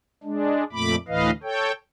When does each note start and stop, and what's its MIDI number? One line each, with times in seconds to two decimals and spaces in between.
0.23 0.64 56
0.23 0.64 62
0.73 0.95 41
0.73 0.95 46
0.73 0.95 57
0.73 0.95 83
0.73 0.95 86
1.08 1.31 38
1.08 1.31 45
1.08 1.31 52
1.08 1.31 71
1.08 1.31 75
1.08 1.31 77
1.43 1.72 69
1.43 1.72 73
1.43 1.72 79